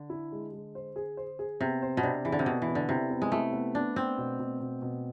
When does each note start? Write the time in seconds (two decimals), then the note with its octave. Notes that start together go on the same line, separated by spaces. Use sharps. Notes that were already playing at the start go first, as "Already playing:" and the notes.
Already playing: D3
0.10 E4
0.32 G#3
0.53 G#3
0.75 C5
0.96 G#4
1.17 C5
1.39 G#4
1.60 C3 B3
1.82 C5
1.97 B2
2.03 C3 D4
2.25 E3 G#4
2.32 D3
2.39 C3
2.46 B2 B3
2.62 E3
2.68 B3
2.75 D3
2.88 C3 E4
3.10 B3
3.22 G#3
3.32 A3 E4
3.53 B3
3.75 B3 D4
3.96 B3 C4
4.18 B2
4.39 B2
4.60 B2
4.82 B2